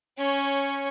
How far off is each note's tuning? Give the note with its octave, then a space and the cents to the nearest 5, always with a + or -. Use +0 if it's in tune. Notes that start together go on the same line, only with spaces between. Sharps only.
C#4 +0 C#5 -10